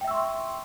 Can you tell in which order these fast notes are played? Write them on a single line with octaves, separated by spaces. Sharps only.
G5 E5 E6 C#6 C6